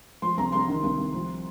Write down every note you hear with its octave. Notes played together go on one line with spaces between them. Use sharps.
F3 C6
C2 A#5
C2 C6
D#3
C2
C2
F3